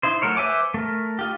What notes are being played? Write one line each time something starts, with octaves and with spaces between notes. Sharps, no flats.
D#4 E4 C5
F#3 A3 A#4 C#5
B4 C5 E5 G#5 D6
A3 A#4
D#4 F4 G4